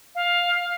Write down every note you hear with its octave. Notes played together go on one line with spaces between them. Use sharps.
F5